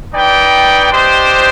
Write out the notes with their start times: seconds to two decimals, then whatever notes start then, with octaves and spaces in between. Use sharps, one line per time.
0.13 D#4 B4 D5 G5
0.90 D4 G4 C5 D#5 G5